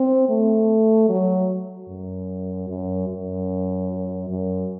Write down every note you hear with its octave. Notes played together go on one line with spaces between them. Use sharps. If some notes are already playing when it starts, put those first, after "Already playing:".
Already playing: C4
A3
F#3
F#2
F#2
F#2
F#2